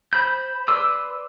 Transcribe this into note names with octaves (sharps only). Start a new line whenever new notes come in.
C5 B5 G6
B4 D5 C6 D6 E6